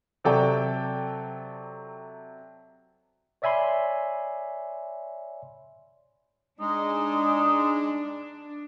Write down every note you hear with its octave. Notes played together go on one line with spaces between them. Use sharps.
C3 F#3 A4 D5 G5 A5
C#5 D5 E5 G#5 B5 C6
G#3 D4 D#4